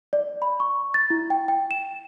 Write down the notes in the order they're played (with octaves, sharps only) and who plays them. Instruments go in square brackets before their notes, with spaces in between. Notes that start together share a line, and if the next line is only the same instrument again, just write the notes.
[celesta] D5
B5
C#6
A6
E4
G5
G5
E7